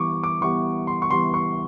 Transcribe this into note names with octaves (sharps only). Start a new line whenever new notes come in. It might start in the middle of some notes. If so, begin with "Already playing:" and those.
Already playing: E3 G3 B3 C#6 D6
D6
E3 G3 B3 C#6
C6
C#6
E3 G3 B3 C6
C#6